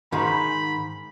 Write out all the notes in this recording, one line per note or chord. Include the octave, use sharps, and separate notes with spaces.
G#2 D#3 G#3 B5